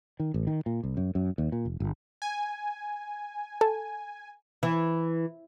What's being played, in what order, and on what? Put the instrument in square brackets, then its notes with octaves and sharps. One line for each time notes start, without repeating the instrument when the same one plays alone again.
[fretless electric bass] D#3
A1
D#3
A#2
C2
F#2
F#2
D#2
A#2
F1
G1
[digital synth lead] G#5
[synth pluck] A4
[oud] E3